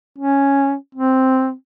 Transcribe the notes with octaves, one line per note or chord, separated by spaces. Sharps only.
C#4
C4